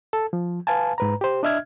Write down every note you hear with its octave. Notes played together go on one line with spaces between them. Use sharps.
A4
F3
B4 F5 G#5 A5
G#2 B4 A#5
G4 C5
D4 D#5 E5 F6 G#6